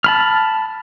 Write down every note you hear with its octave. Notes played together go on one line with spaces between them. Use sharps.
A5 B5 F6